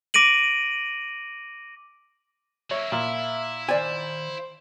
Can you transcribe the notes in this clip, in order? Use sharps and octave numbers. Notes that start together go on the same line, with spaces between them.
D6 A#6 D7 D#7 F#7
F#3 A#3 C#5 E5
A#2 E4
D#3 C5 D5 G#5